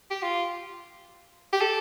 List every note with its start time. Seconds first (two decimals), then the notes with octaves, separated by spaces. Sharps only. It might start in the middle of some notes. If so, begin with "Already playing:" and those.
0.11 G4
0.23 F4
1.53 G4
1.61 A4